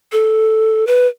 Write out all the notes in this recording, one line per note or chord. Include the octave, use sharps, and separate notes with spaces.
A4
B4